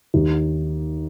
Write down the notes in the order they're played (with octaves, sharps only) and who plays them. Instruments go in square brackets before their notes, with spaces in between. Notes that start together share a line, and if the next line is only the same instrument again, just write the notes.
[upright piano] D#2